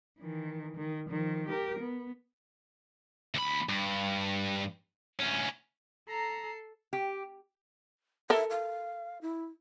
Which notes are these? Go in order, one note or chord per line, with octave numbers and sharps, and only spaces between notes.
D#3 E3
D#3
D#3 F3
G4 A#4
B3
D2 B5
G2
D2 C#4
A4 A#5 C7
G4
A4 A#4 E5
F5
E4